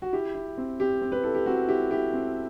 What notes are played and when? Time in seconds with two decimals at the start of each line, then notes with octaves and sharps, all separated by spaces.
0.02 F#4
0.13 E4 G4
0.35 E4
0.57 C4
0.80 C4 G4
1.02 C4
1.12 B4
1.24 E4 A4
1.35 G4
1.46 C4 F#4
1.68 E4 G4
1.91 E4 G4
2.13 C4